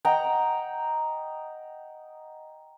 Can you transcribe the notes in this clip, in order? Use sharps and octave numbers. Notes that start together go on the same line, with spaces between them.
D#5 F#5 G5 A#5